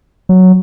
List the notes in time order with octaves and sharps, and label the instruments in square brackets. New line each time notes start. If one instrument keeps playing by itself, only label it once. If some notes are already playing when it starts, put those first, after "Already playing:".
[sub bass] F#3